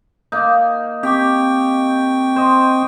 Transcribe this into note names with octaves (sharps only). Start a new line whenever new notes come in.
A#3 D#4
C4 G4 G5 C#6
C5 D#5